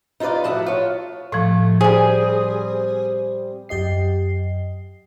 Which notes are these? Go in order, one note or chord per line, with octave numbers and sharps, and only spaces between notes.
D#4 F4 A4 B4 D5
A2 F3 F#4 E5 F#5
F4 C#5
A2 F3 A3
G3 C4 G#4
F#2 G4 D#5 C7